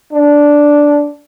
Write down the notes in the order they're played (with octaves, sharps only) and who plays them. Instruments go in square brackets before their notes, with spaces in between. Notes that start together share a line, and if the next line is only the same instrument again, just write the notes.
[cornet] D4